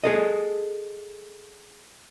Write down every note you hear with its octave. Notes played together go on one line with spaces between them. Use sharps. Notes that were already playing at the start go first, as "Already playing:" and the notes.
G#4 A4 D#5